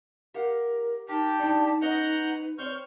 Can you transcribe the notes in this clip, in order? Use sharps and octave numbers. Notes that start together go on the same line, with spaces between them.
G4 A#4 F5 F#5
D#4 G4 A#4 A5
F3 D4 D#4
C#4 B4 D#5 F#5 A#5 G6
C4 C5 C#5 C#6 F6 G6